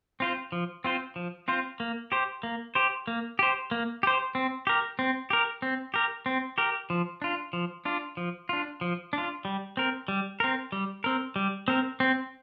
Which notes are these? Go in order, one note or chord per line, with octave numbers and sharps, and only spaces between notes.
C4 F4 C5
F3
C4 F4 C5
F3
C4 F4 C5
A#3
G4 C5
A#3
G4 C5
A#3
G4 C5
A#3
G4 C5
C4
G4 A#4
C4
G4 A#4
C4
G4 A#4
C4
G4 A#4
F3
D4 F4
F3
D4 F4
F3
D4 F4
F3
D4 F4
G3
C4 A#4
G3
C4 A#4
G3
C4 A#4
G3
C4 A#4
C4